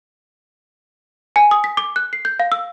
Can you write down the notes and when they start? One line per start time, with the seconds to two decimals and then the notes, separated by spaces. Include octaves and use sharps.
1.36 G#5
1.51 D#6
1.64 B6
1.77 D6
1.96 F#6
2.13 C7
2.25 G6
2.40 F5
2.52 E6